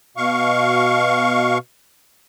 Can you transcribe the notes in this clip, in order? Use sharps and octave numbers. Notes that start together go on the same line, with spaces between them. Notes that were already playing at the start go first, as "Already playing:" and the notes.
B2 F5 C#6